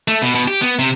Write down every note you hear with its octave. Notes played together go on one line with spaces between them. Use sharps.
A3
B2
B2
G4
B3
C3